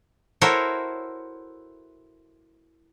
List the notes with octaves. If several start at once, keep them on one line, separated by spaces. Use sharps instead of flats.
E4 F#4 A4 A#4 C5 C#5